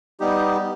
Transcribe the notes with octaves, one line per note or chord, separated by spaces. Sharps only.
G3 B3 D#4 G4